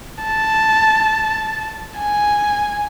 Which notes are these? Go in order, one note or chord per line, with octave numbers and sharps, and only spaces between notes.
A5
G#5